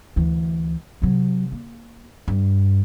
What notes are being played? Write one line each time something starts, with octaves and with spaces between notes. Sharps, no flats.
D2 E3
C3 F#3
A#3
G2